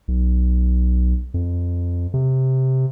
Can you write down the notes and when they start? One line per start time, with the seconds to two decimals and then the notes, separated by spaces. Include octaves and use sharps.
0.08 B1
1.34 F2
2.14 C3